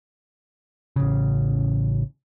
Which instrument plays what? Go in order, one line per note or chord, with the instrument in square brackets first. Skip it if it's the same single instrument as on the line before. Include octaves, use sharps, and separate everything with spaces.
[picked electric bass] A1 C#3